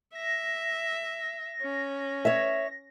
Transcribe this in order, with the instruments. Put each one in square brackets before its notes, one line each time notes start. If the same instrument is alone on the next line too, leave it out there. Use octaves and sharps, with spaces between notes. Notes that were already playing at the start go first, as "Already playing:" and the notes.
[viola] E5 [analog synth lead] A#6
[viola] C#4
[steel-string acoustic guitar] C#5 E5